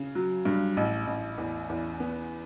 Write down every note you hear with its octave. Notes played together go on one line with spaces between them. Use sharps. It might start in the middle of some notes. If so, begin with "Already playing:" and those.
Already playing: C#3
F#3
G2
A1
A1
E2
E2
B3